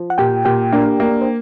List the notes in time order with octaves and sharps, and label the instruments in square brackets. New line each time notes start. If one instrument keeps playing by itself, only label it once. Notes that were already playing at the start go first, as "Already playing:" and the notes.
Already playing: [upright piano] F3
[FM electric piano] F#5
[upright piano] A#2 [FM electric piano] G4 G5
[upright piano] A#2 [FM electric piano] G4 G5
[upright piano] A#3 [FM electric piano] D4 D5
[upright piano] A#3
[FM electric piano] C5